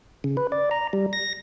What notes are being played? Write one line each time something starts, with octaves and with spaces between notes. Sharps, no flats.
C#3
B4
D5
A#5
G3
A#6